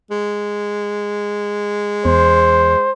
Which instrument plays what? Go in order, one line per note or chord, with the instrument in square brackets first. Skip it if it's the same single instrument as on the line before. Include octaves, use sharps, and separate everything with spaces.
[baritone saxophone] G#3
[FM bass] E2 [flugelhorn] C5